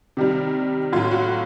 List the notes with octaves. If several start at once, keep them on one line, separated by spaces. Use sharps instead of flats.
C3 D#3 G3
A2 F#3 F4
F#4